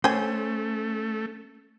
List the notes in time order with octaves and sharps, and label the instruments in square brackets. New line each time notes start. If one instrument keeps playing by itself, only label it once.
[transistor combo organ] A3 [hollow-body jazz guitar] C#4 C5 [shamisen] G5 G#5